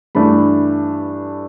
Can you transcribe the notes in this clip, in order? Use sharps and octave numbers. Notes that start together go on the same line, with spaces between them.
G2 E3 A3 D4 B5